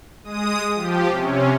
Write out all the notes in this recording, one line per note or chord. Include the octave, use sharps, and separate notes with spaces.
G#3 D#6
F3 G4
C3 C#4